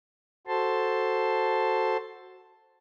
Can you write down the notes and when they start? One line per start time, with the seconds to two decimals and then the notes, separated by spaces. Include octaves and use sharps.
0.47 F#4 A4 C5 A5 C6